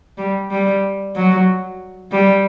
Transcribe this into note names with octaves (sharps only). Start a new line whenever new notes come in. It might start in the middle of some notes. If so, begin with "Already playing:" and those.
G3
G3
F#3
G3